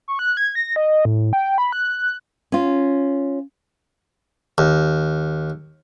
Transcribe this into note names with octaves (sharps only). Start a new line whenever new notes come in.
C#6
F#6
G#6
A#6
D#5
A2
G5
B5
F#6
C#4 F4
D#2